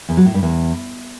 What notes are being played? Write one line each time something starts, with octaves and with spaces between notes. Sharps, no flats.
E2
F#3
A2
G2
E2